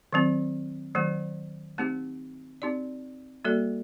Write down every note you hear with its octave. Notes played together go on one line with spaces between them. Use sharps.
D#3 F#3 C4
D#3 F#3 A3
A3 C4 D#4 G4
C4 D#4 G4 D5
G3 A#3 F#4 A4 D5